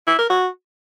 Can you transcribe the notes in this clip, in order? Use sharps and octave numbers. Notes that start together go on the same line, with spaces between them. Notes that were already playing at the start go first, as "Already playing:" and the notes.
E4
A#4
F#4